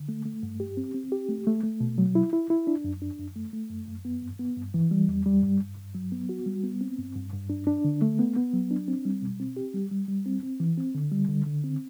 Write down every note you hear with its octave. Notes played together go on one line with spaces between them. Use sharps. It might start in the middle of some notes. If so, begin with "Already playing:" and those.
Already playing: D3
A3
A3
G2
G4
C4
C4
G4
A3
A3
A3
B2
F#3
E4
E4
E4
D4
F#2
D4
F#2
A3
A3
F#2
F#2
B3
G2
B3
G2
E3
G3
E2
G3
G2
G2
G2
F#3
B3
F#4
G3
B3
C4
G2
G2
G2
D4
D4
D3
A3
B3
B3
F#3
D4
C4
G3
B2
C4
G4
G3
G3
G3
C4
C4
E3
C4
D3
G3
D3
D3
C4